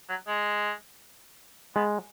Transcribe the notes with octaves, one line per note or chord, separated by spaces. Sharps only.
F#3
G#3
G#3 B3